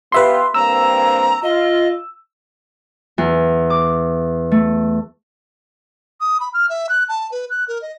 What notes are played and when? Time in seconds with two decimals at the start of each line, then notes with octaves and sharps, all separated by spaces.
0.12 B3 F4 G4 B4 E5 C6
0.54 G2 A#3 C4 A#5 E6
1.43 F4 D#5
3.18 E2
3.70 D6
4.51 A3
6.21 D#6
6.40 B5
6.54 F6
6.70 E5
6.89 F#6
7.09 A5
7.32 B4
7.50 F#6
7.68 A#4
7.82 D#5